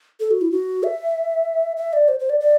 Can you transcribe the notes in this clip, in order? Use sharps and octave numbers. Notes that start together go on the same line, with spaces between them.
A4
F#4
E4
F#4
E5
E5
D5
C5
C5
D5
D5